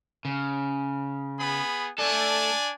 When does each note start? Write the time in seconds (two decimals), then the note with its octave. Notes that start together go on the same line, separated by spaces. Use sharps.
0.25 C#3
1.40 B3 G#4 B5
1.98 A3 D4 A4 D5 G#5